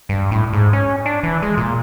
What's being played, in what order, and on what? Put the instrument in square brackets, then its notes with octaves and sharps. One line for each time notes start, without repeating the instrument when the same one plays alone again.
[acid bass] G2
A2
G#2
C#4
D4
E3
G#3
A#2